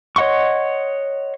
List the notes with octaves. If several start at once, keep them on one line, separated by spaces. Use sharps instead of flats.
C#5 D#5 F#5 C6 C#6